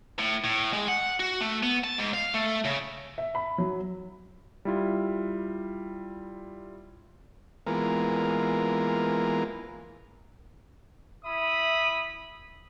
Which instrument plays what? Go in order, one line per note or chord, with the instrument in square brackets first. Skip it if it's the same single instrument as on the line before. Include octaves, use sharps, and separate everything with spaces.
[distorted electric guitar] A2
A2
G#3
F#5
F#4
A3
B3
A5
G#2
F5
A3
C#3
[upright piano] E5
B5
F#3
[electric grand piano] G3 E4 F4
[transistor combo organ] E3 G#3 A#3 B3 F4 A#4
[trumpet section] E4 E5 B5 D#6